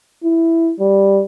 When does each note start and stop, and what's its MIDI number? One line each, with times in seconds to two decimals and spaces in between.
0.24 0.72 64
0.80 1.22 55